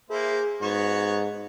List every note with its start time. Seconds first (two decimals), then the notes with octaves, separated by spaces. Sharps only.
0.10 A#3 E4 G#4 C5
0.61 G#2 B3 F#4 C#5